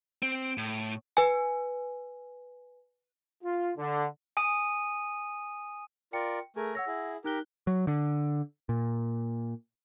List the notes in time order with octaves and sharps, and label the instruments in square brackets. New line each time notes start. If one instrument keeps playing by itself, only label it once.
[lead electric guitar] C4
A2
[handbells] B4 G#5
[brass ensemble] F4
D3
[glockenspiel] G#5 D#6 D#7
[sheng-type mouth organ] F4 A#4 D5 [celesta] G5 C#7
[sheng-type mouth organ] A3 A#4 G#5 [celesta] G#4
[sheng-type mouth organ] C#5 [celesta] F#5 E6 A#6
[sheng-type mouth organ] E4 G#4
[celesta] D#4 F#6 G7 [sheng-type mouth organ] G4 A#4
[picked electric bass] F#3
D3
A#2